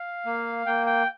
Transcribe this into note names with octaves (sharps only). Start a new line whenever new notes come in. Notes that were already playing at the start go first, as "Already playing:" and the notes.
Already playing: F5
A#3
A#3 G5
G5